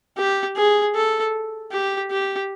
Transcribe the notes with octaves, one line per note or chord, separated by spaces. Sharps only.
G4
G#4
A4
G4
G4